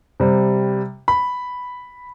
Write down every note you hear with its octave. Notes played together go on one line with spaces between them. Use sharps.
C3 G3
B5